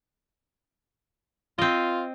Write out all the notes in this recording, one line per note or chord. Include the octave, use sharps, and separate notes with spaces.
C4 F4 D#5